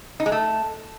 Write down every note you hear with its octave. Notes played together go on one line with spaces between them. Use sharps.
D#4
G#3
A3